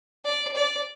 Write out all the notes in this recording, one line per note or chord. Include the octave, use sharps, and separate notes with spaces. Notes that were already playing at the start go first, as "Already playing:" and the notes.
D5
D5